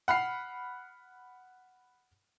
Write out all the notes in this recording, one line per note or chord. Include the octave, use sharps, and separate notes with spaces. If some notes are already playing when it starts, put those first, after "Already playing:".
F#5 B5 F6 C7